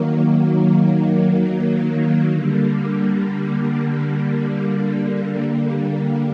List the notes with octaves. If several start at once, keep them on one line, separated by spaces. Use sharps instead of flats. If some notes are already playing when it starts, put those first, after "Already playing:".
Already playing: D#3 F#3 A#3
D3 G3 A#3